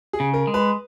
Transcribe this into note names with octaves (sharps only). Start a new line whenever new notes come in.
G#4
C#3
A#4
G#3
B4